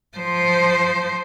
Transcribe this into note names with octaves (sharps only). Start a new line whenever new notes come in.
F3 C5